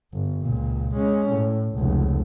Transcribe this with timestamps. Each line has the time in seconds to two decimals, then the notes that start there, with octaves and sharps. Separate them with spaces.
0.13 G1
0.42 C#2 A#2
0.95 G#3 C#4
1.31 A2
1.75 F1 C#2